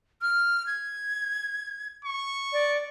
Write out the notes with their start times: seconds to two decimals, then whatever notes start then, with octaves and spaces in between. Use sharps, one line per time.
0.22 F6
0.67 G#6
2.05 C#6
2.53 D5